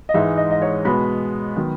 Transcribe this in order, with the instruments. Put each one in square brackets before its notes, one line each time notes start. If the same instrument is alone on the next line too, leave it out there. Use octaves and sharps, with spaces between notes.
[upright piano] D#5
G#2 E3 G#3 D#4 E5
D#5
D#5
C#5
B2 G#3 B3 B5
D#3 F#3 B3